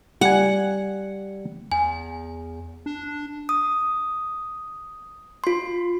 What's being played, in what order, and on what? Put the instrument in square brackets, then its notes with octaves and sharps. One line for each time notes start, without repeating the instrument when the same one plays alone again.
[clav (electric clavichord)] G3 G#5 [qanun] F#5
[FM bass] E2 [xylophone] G#5
[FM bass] D4
[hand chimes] D#6
F4 C6